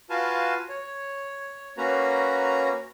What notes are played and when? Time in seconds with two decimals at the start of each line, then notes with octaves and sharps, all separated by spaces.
0.10 F4 F#4 B4 F5 G#5 A5
0.69 C#5
1.78 A#3 C#4 F#4 B4 A#5